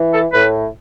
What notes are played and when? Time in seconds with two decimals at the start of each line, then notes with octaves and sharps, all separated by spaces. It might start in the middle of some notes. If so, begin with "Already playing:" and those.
Already playing: E3
0.13 A4
0.33 A2 B4